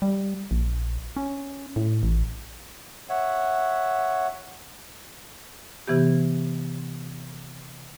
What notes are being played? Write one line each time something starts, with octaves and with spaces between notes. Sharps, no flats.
G3
A#1
C#4
A2
A1
C#5 E5 F#5
C3 E3 B3 G4